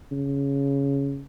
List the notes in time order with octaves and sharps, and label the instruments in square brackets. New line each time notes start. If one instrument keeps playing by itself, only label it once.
[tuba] C#3